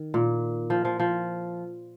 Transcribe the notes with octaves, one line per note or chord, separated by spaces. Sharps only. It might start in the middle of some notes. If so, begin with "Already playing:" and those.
Already playing: D#3
A#2
F3
F3
F3